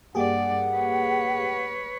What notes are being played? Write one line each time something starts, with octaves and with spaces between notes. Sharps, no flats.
G2 A#3 G4 G#4 D5 F#5
B4 C#5